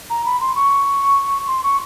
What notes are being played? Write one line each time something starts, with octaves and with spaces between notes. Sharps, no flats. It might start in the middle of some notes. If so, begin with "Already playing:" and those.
A#5
B5
C6
C#6
C6
C#6